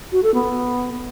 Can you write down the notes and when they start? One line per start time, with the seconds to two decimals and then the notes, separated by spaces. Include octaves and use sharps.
0.12 F#4
0.23 A4
0.34 B3